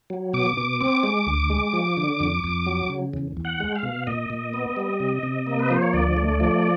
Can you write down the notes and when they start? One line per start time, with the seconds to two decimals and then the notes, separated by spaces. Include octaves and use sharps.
0.10 F#3
0.34 B2 D6
0.57 B2
0.81 C4 D6
1.03 G#3
1.27 D2
1.50 G#3
1.73 F3
1.97 D3
2.20 F2
2.44 F2
2.66 F#3
2.89 C#3
3.13 E2
3.37 E2
3.45 F#5
3.60 G#3
3.76 F5
3.83 B2
4.07 A#2 D#5
4.30 A#2
4.53 B3
4.76 G3
5.00 C3
5.23 C3
5.46 A#3
5.59 B4
5.70 F3 C5
5.82 C#5
5.93 D2 D5
6.17 A3
6.40 F3 D5